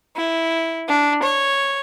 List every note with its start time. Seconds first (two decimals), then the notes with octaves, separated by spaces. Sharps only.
0.16 E4
0.88 D4
1.22 C#5